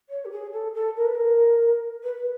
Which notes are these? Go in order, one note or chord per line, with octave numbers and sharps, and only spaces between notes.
C#5
G4
G#4
A4
A4
A#4
B4
A#4
B4